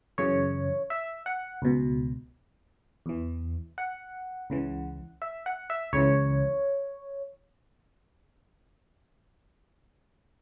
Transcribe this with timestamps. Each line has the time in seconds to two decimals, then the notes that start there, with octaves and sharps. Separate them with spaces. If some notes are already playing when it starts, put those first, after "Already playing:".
0.18 F#2 C#3 E3 C#5
0.90 E5
1.26 F#5
1.62 C#2 B2
3.06 E2 E3
3.78 F#5
4.50 C#2 C#3 E3
5.22 E5
5.46 F#5
5.70 E5
5.93 C#2 C#3 E3 C#5